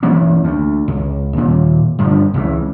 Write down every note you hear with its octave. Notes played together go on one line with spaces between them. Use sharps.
E3 A#3 C#4
D2
C#2
D#2 A#2
G2 D3 F3
C#2 C#3 E3